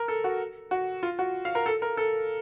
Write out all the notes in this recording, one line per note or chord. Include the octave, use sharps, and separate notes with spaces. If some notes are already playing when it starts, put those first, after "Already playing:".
Already playing: A#4
A4
F#4
F#4
F4
F#4
F5
A#4
A4
A#4
A4